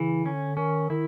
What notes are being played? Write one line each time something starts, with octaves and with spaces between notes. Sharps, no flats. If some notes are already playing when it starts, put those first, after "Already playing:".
Already playing: C#3 E3
D3 C#4
D#3 C#4
D#3 E4